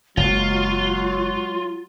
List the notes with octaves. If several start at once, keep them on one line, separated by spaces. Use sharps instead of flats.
F#1 F#3 G#3 F4